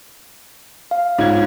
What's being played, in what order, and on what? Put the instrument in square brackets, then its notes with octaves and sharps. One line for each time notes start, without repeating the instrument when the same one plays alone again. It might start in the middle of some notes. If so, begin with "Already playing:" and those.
[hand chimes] F5
[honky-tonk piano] G#2 G#6 [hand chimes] F4 C#5